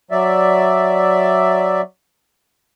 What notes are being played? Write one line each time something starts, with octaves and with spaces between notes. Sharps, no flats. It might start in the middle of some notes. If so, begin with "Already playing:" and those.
F#3 D5 E5